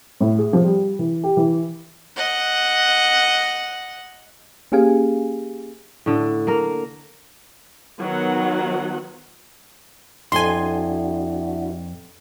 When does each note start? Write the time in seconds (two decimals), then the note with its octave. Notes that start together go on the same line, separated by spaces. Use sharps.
0.21 A2
0.39 G#4
0.53 F3
0.64 G3
0.99 E3
1.24 G4
1.37 E3
2.16 D#5 F#5
4.72 A#3 C#4 G4 G#4 F5 G#5
6.06 A2 D3
6.47 A#3 A#4
7.99 D#3 F#3 B3 F#5
10.32 F2 D4 E4 F#4 G#5 C6